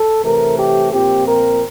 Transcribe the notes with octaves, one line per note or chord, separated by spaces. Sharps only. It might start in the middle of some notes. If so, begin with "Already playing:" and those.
Already playing: A4
C3 E3 A3 A#4
G4
A#2 F3 C4 G4
A#4